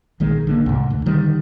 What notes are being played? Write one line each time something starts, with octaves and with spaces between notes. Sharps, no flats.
A#1 D#3 G#3
D3 D#3 A#3
C2 G#2
D2
D3 D#3 G3